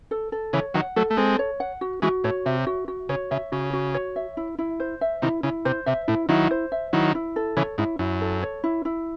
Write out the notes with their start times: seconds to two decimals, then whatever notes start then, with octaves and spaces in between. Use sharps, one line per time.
0.11 A4
0.32 A4
0.53 C#3 E3 C#5
0.74 D#3 F#3 F#5
0.96 F#3 A3 A4
1.10 A3
1.17 G#3 C4 A4
1.39 C#5
1.60 F#5
1.81 F#4
2.02 E3 G#3 F#4
2.24 A2 C#5
2.46 C3 E5
2.67 F#4
2.88 F#4
3.09 C#3 C#5
3.31 C#3 E5
3.52 C#3 F#4
3.73 F#4
3.94 C#5
4.16 E5
4.37 E4
4.59 E4
4.80 C5
5.01 E5
5.22 C3 D#3 E4
5.43 C#3 E4
5.65 C3 C5
5.86 C3 E5
6.08 A2 E4
6.29 D#3 F#3 E4
6.51 C5
6.72 E5
6.93 D#3 F#3 E4
7.15 E4
7.36 A4
7.57 C#3 E3 C#5
7.78 G#2 E4
7.99 F#2 E4
8.21 A4
8.43 C#5
8.64 E4
8.85 E4